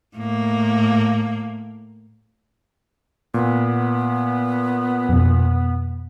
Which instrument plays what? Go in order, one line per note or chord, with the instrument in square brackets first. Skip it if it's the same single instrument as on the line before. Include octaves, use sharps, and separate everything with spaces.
[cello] A2 A#3
[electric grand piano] A#2 [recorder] B3
[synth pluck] F2 B2